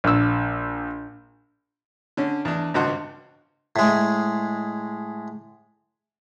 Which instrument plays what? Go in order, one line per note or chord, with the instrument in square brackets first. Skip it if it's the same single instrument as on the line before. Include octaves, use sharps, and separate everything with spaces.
[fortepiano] A#1 E6
D3 C#4
E2 D4
G#1 C#2 G2 F#4 C5 F#5
[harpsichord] A2 G#3